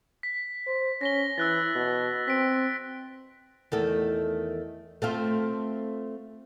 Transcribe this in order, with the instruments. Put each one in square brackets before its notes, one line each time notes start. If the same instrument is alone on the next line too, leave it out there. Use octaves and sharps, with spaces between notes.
[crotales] B6
[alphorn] C5
[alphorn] C#4 [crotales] A#6 B6 G7
[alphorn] E3 [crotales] E6 F#6 A6
[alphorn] B2
[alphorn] C4 [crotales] B6 D7
[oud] E2 D#3 A3
A3 C4 F4